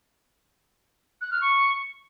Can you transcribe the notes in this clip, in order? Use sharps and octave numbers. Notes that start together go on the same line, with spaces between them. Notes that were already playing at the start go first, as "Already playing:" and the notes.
F#6
F6
C#6